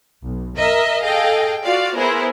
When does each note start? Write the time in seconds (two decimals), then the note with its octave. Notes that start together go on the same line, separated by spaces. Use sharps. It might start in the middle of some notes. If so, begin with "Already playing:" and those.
0.23 B1
0.56 A#4 D#5 E5
1.03 G#4 A4 D#5 F5 G5
1.64 F4 F#4 D5 F5
1.98 B3 E4 G#4 A#4 C5